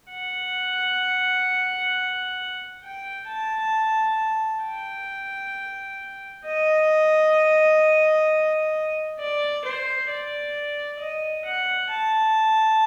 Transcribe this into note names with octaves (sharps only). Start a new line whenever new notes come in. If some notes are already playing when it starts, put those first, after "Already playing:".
F#5
G5
A5
G5
D#5
D5
C5
D5
D#5
F#5
A5